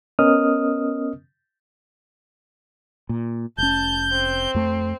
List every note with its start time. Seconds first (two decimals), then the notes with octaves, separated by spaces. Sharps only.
0.19 B3 C#4 A#4 D#5 D#6 F6
3.09 A#2
3.58 F1 C#4 A5 G6
4.12 C4
4.55 F2 A3